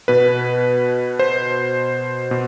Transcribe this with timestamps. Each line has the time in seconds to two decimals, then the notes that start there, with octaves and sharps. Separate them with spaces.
0.08 B2 B4
1.19 C5
2.31 B2